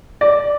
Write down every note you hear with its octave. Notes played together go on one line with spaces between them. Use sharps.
D5